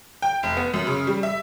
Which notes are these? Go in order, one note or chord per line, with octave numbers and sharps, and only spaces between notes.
G5
F1
B3
F#2
C#3
G3
E5